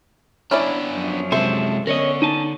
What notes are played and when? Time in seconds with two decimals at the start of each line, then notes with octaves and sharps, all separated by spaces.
0.51 B3 C#4 D4 E4 D5
0.89 F#2 F3
1.32 C3 G#3 A4 C5 E5
1.87 D3 B3 C#4 A#4 C#5 D#5
2.22 D#4 G#5 A5